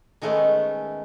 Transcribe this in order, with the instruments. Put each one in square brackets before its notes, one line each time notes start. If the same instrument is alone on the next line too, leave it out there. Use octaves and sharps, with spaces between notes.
[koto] D#3 G#3 A3 B3 C#4